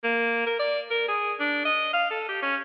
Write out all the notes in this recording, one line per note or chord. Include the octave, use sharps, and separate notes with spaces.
A#3
A#4
D5
A#4
G#4
D4
D#5
F5
A4
G4
C#4